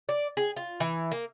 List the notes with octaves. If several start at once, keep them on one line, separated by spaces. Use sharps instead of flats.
D5
G#4
F4
E3
A#3